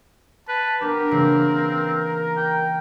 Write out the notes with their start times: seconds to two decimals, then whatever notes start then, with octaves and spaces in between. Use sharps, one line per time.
0.48 B4 A5
0.81 B3 D4 G4 A#4
1.11 C#3 E3 A#3 C4
2.37 G5